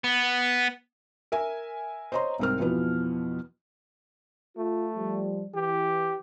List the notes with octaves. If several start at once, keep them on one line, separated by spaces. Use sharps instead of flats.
B3
A#4 E5 G#5
C5 C#5 D#5 A#5 C6
C2 G#2 C4 A#4 F6
F2 B2 E3 F3 B3
A3 F4
F3 G3
E3 G4